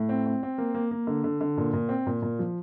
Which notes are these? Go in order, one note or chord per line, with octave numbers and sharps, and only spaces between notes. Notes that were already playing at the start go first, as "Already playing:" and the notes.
Already playing: A2
C4
C4
C4
A#3
A#3
A#3
D3
D3
D3
A#2
A#2
C4
A#2
A#2
F3